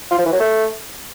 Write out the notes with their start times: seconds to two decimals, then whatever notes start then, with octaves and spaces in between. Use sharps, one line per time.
0.11 F4
0.18 F3
0.26 E3
0.33 F#3
0.40 A3